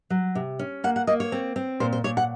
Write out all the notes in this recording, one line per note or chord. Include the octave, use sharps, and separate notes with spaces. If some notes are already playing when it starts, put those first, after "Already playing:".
F#3
C3
C#4
A#3 F#5
F#5
A#3 D#5
C#5
C4
C4
A#2 C5
C5
A#2 C#5
F#5